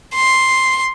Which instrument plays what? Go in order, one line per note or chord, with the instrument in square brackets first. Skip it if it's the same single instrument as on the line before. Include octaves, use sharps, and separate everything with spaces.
[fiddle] C6